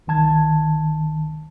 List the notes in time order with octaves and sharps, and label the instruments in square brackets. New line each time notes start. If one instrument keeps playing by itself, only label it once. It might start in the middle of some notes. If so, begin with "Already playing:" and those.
[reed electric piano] C2 D#3 A5 G#6